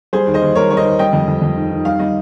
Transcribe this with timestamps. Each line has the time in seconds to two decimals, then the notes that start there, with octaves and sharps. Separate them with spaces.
0.13 G3 G#4 C5
0.27 D#2
0.34 C5 D#5
0.42 D#2
0.55 G3 A#4 C#5
0.70 G3 C#5
0.77 C5 D#5
0.84 D#2
0.99 G3 D#5 G5
1.13 F2
1.28 F2
1.42 F2
1.56 D#3
1.72 D#3
1.85 G3 F5
1.99 G3 D#5